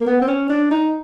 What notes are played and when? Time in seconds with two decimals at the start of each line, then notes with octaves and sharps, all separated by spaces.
0.01 A#3
0.06 B3
0.21 C4
0.27 C#4
0.49 D4
0.71 D#4